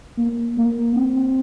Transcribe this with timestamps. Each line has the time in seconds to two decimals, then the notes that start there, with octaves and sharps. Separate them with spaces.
0.18 A#3
0.58 A#3
0.96 C4